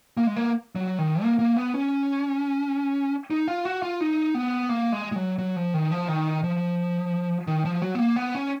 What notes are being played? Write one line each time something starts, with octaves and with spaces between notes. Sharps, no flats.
A#3
G#3
A#3
F#3
D#3
A#3
A#3
B3
C#4
D#4
F4
F#4
F4
D#4
B3
A#3
G#3
G#3
F#3
F#3
F3
D#3
F3
D#3
F3
D#3
F3
F#3
B3
A#3
B3
C#4